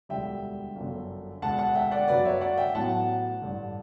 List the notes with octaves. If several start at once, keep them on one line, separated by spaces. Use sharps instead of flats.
E1 D2 D3 G3 E5 G5
G1 F#2 D3
E1 D2 D3 F#5 A5
F#5 A5
E5 G5
D5 F#5
G1 F#2 D3 F#3 A3 B4 D5
C#5 E5
D5 F#5
E5 G5
A1 A2 F#3 B3 F#5 A5
A1 G2 D3